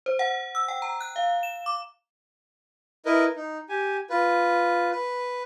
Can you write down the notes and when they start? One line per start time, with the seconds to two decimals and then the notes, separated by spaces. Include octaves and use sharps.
0.06 C5
0.19 F#5
0.55 E6
0.68 G5
0.82 A#5
1.01 F#6
1.16 F5
1.43 E7
1.66 D6
3.05 E4 A#4 B4 D#5
3.36 D#4
3.69 G4 G#5
4.10 F4 B4
4.92 B4